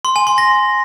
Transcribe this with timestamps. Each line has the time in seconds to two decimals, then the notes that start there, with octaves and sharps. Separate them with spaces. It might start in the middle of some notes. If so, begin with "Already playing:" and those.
0.05 C6
0.16 G#5
0.27 C6
0.38 A#6